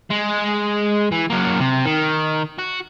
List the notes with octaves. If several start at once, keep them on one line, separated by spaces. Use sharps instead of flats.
G#3
E3
F#3 A#3
C3
D#3
F#4